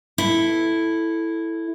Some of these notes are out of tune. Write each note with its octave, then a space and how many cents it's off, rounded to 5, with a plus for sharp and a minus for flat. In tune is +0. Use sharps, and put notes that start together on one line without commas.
E4 +0 A4 +0